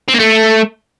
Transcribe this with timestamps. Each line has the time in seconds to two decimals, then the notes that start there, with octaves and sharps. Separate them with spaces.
0.09 C4
0.14 A#3
0.20 A3